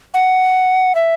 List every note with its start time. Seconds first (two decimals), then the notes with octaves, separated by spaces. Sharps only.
0.14 F#5
0.95 E5